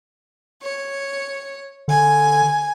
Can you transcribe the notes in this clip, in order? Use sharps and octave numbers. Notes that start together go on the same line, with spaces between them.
C#5
D3 G#5